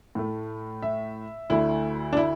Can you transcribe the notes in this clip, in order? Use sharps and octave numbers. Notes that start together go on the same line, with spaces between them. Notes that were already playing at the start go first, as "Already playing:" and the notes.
A2 A3
E5
D2 D3 A3 E4
D4
E4